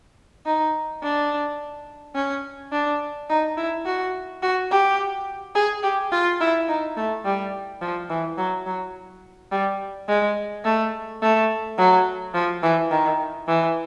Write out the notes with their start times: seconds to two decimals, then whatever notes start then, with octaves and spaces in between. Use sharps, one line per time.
0.46 D#4
1.03 D4
2.15 C#4
2.72 D4
3.29 D#4
3.57 E4
3.86 F#4
4.43 F#4
4.71 G4
5.55 G#4
5.83 G4
6.12 F4
6.41 E4
6.68 D#4
6.97 A3
7.25 G3
7.82 F3
8.10 E3
8.38 F#3
8.66 F#3
9.52 G3
10.08 G#3
10.64 A3
11.22 A3
11.78 F#3
12.34 F3
12.63 E3
12.91 D#3
13.48 E3